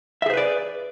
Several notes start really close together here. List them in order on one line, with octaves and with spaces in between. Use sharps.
E5 G#4 C5 B4 D5